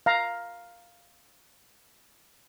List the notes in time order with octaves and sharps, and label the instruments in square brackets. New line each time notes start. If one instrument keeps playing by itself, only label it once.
[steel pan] F5 A#5